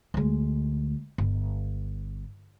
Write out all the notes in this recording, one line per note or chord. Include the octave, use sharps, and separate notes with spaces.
D2 G#3
G1